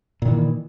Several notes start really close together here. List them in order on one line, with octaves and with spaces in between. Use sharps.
A#2 D#3 E3